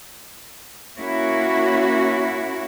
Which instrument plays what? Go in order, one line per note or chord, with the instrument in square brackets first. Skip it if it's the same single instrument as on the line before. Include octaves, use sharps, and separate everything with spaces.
[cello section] A#3 C#4 E4 F#4